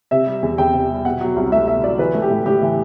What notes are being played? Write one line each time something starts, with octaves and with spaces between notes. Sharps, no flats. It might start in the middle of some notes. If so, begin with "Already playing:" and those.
C3 E5
G3
E2
E2 G5
C3
G3
B2 F#5
F#3
C2
A3 E5
B2 E5
F#3 D5
E3 B4
A3
G4
A2
A2 G4
E3